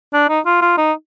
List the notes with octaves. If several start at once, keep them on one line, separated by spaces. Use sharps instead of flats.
D4
D#4
F4
F4
D#4